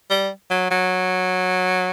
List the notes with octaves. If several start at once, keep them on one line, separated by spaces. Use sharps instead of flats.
G3
F#3
F#3